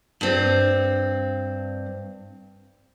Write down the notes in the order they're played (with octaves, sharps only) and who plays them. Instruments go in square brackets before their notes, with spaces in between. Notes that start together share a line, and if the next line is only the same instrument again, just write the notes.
[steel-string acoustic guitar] G2 C4